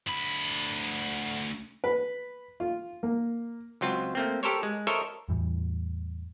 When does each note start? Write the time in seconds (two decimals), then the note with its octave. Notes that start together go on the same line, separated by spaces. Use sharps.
0.08 D2 B5
1.84 B4
2.60 F4
3.03 A#3
3.81 C#2 F#3 C4 F4
4.15 A3 A#3 C4
4.43 G4 A4 A#4 C5 C#5
4.63 G#3
4.87 A4 A#4 C5 C#5 D#5 E5
5.29 E2 A2 E3 G3